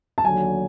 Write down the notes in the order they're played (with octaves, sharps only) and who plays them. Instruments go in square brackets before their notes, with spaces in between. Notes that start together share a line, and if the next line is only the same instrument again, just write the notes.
[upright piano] A5
[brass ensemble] D#2 D3 F#3 [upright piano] G#5